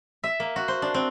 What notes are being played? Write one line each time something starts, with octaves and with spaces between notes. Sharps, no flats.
E5
A#3
F#4
C5
D4
C4